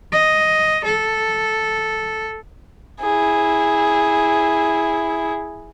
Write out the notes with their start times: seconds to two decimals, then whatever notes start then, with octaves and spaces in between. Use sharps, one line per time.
0.12 D#5
0.84 A4
3.00 E4 G#4